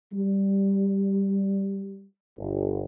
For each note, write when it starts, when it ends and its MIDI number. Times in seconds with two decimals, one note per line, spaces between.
0.14 2.06 55
2.39 2.85 31